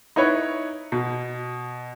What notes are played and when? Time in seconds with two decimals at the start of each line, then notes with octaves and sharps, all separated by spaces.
0.16 D#4 E4 B4 C#5
0.92 B2